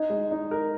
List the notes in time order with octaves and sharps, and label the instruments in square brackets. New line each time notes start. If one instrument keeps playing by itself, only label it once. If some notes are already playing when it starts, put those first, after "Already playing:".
Already playing: [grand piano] D#4 [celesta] D#5
[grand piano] G#3
D#4
A#4